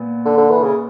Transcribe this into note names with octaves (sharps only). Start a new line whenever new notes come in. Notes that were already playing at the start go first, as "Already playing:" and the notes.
Already playing: A#2 B3
D3
D3
E3
C#3